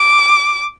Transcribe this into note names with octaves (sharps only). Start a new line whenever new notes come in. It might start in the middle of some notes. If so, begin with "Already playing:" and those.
Already playing: D6